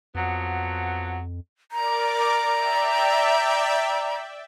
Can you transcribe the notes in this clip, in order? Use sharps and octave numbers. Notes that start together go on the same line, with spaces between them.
F2 F3 F#3 B3
A#4 D5 A#5 D6
D5 E5 G5